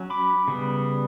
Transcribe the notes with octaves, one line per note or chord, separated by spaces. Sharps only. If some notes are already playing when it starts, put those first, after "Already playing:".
Already playing: F#3 C#4
B5 D6
C#3 G3 B3